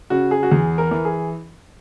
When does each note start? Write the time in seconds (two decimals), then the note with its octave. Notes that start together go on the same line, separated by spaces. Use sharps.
0.10 C#3 F#4
0.31 G#4
0.43 F#4
0.51 E2 G#4
0.78 A#4
0.91 E3
1.05 G#4